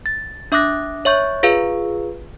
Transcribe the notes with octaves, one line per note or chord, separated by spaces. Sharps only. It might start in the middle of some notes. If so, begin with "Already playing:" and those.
A6
D4 E5 D6 D#6 F#6 A#6
C#5 E5 C#6 G6
F4 G#4 B4 F5